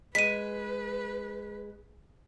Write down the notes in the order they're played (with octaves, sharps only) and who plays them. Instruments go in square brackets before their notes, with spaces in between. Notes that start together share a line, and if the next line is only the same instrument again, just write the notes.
[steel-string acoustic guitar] G#3 [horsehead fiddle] B4 [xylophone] B6 D#7